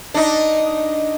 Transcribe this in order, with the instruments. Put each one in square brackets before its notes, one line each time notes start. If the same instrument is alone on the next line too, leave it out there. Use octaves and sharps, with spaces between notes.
[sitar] D4 D#4